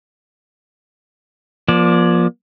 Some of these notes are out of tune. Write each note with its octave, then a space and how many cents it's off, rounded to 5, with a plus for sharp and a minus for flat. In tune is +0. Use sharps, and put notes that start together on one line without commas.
F3 +0 A#3 +40 D5 +0